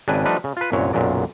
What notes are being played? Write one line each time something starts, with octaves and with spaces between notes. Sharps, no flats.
G#1 C#3 D4 B4 G5 G#5
F3 G3 A3 D4 D#4 B4
C#3
F4 B4
C2 F#2 A#2 F#3 C#5
B1 F#2 A#2 C#3 F#3 D5